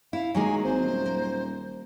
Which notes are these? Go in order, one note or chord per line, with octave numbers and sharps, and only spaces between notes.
E4 F5
D#3 F#3 G#3 A#3 G#5
G#1 C5
D#1
A#3